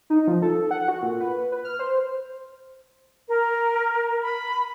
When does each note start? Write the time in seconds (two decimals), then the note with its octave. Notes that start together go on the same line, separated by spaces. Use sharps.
0.10 D#4
0.28 F3
0.42 A4
0.71 F#5
0.88 F#4
1.02 A#2
1.21 B4
1.52 B4
1.65 F6
1.79 C5
3.27 A#4
4.20 B5